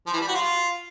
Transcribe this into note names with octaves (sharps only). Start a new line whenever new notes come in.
F3
E3
G3
F#4
F4